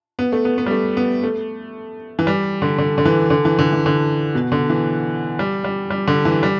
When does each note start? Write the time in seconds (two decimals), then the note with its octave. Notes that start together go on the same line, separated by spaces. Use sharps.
0.19 B3
0.32 A3
0.45 B3
0.58 B3
0.66 G3
0.71 A3
0.97 B3
1.24 A3
2.19 E3
2.27 G3
2.62 D3
2.78 D3
2.98 D3
3.05 E3
3.30 D3
3.45 E3
3.59 D3
3.73 E3
3.86 D3
4.35 B2
4.52 D3
4.70 E3
5.39 G3
5.64 G3
5.90 G3
6.08 D3
6.25 E3
6.43 G3